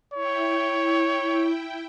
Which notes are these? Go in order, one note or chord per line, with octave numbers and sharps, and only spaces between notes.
E4 C#5 G5